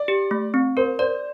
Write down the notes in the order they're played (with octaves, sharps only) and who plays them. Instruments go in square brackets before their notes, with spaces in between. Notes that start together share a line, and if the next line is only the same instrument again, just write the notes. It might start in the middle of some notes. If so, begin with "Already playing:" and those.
Already playing: [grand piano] D5
[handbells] G4
A3
C4
[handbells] A#4 [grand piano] C5
[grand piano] C5 [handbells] D5